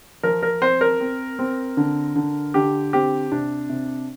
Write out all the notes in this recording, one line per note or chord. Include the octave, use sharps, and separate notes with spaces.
F3 A#4
A#4
C4 C5
A#4
C4
C4
D3
D3
D3 G4
C4 G4
C3 D4
C3